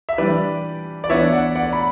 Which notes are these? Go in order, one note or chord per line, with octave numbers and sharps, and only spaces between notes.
E5
E3 G3 D4 B4 D5
D5
E3 B3 D4 C#5 E5
D5 F#5
D5 F#5
B5